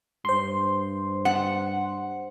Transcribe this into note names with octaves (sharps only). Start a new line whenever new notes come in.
G2 C5 C6
F#5